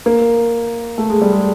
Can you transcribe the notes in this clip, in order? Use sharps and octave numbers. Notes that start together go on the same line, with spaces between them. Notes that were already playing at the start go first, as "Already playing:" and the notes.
A#3
A3
G#3
G3
G#3